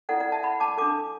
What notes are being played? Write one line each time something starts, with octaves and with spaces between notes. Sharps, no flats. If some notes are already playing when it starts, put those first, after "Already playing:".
E4 A4 D5 F#5
D5 F#5
E5 A5
F#5 B5
A5 D6
D4 A4 A5 D6